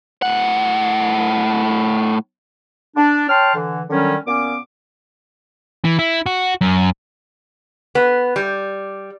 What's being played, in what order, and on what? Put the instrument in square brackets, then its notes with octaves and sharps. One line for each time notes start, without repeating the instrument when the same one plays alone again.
[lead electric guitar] A2 F#5
[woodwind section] D4
C#5 G5 A5 C6 F6
D3 E3
D3 D#3 F#3 G3 C#4
A#2 B3 C#4 D6
[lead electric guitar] E3
E4
F#4
F#2
[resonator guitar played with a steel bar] B3
G3